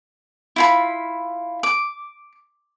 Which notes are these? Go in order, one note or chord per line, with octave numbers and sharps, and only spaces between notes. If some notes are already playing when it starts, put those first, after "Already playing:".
E4 F4 B5
D6